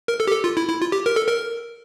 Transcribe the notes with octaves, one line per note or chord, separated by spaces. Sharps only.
A#4
A4
G4
A4
F4
E4
E4
F4
G4
A#4
A4
A#4